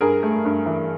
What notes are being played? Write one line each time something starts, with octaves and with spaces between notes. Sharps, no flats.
G2 G#4 A#4
A3
G2
E3